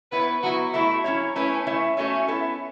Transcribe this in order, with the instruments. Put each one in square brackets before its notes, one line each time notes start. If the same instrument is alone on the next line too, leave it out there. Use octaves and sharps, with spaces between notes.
[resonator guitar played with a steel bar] B3 E4 C#5 [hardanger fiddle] B4
[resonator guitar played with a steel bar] F#3 B3 E4 [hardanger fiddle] F#4
[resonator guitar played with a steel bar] A3 F#4 A4 E5 [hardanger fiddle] E4
[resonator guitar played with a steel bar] F#3 C#4 E4 C#5
[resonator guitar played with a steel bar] A3 E4 B4 [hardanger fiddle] C#4
[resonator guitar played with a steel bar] A3 E4 C#5 E5
[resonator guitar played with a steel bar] A3 F#4 A4 C#5 E5 [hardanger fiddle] C#4
[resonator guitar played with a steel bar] B3 E4 A4 E5